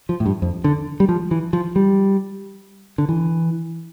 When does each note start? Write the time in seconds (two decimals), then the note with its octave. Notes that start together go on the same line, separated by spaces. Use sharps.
0.09 F3
0.20 A2
0.26 G2
0.42 F2
0.64 D3
1.00 G3
1.09 F3
1.31 E3
1.53 F3
1.76 G3
2.98 D3
3.09 E3